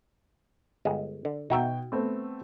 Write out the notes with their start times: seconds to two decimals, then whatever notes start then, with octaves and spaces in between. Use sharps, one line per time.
0.85 G1 G#3
1.25 D3
1.50 B2 D#4 F#4 E5 G5
1.92 A3 B3 C4